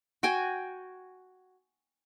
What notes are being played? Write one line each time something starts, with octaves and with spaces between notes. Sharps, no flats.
F#4 G5 G#5